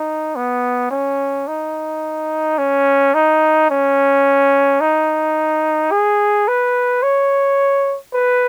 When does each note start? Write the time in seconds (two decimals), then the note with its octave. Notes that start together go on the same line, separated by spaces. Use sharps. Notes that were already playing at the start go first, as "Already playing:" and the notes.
Already playing: D#4
0.36 B3
0.91 C#4
1.48 D#4
2.58 C#4
3.15 D#4
3.70 C#4
4.81 D#4
5.92 G#4
6.48 B4
7.03 C#5
8.14 B4